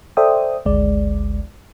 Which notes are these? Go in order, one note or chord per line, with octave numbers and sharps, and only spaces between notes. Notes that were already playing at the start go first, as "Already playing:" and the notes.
A4 C5 D5 E5 G5 D#6
G#1 D2 G#3 D5